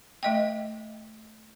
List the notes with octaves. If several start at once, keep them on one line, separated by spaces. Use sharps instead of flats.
A3 D#5 G5